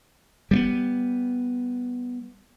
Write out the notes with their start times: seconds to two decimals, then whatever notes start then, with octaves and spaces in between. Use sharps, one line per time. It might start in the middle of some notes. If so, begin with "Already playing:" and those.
0.51 G3 A#3 B3